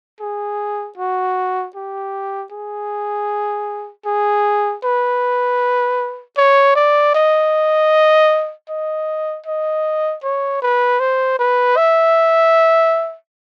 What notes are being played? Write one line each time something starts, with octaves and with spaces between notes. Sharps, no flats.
G#4
F#4
G4
G#4
G#4
B4
C#5
D5
D#5
D#5
D#5
C#5
B4
C5
B4
E5